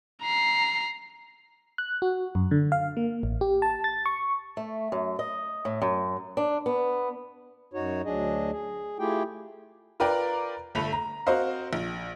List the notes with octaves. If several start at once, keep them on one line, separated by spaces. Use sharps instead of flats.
A#5 C7
F#6
F#4
F#2
D3
F5
A#3
A1
G4
A5
A6
C#6
A3
F#2
D#5
A2
F#2
D4
B3
F#2 D#4 F#4 C#5
D2 F#3 D4 G#4 D#5
G#4
A3 E4 F4 G4 G#4 G5
F4 A#4 B4 D5 G5 A#5
G1 A3 A4 B5 F7
A#5
C4 F#4 A#4 C5 D#5 F5
A#1